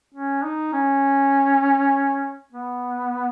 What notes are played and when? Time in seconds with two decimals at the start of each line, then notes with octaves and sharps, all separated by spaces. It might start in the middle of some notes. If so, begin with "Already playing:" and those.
0.14 C#4
0.44 D#4
0.73 C#4
2.52 B3